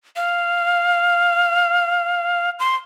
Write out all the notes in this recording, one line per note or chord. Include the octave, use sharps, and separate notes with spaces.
F5
C6